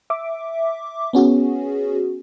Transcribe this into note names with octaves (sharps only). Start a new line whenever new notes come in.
E5 D6
B3 C#4 F#4 G#4